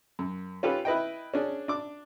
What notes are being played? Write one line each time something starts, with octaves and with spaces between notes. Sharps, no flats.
F#2
C#4 F4 G4 A4 B4
E4 B4 D#5 G5
C#4 D4 G#4
D4 D6